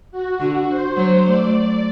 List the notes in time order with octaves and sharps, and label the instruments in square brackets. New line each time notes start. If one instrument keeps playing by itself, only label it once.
[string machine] F#4
[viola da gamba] D3
[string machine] C5
[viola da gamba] F#3
[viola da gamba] A3 [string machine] D5